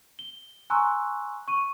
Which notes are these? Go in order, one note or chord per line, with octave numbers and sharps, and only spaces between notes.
G7
G#5 A#5 C6 C#6 E6 F#6
C#6 D#7